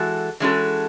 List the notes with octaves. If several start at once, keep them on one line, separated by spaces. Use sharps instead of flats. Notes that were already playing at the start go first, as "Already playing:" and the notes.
Already playing: E3 G#3 F#4 A4
E3 G#3 C#4 F#4 A4